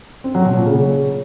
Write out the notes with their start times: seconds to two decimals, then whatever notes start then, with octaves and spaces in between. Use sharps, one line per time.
0.24 C4
0.35 F#3
0.45 B2
0.56 A#2
0.66 C#3